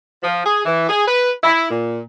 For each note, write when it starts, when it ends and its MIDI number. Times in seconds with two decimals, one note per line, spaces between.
0.23 0.43 53
0.45 0.61 68
0.65 0.87 52
0.89 1.02 68
1.06 1.30 71
1.43 1.67 64
1.70 2.00 46